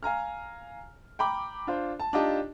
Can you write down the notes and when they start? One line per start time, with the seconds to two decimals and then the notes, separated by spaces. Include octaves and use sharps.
0.03 F5 G#5 A#5 F6
1.19 G5 A#5 B5 D6
1.67 D4 F4 C5
2.00 A5
2.13 D4 D#4 F4 G4 D#5 A5